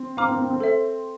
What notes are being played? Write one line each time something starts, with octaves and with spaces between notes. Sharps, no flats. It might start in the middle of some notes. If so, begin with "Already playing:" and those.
Already playing: C4
C4 F5 A#5 D6 F6
C4
C4
C4
A4 C5 E5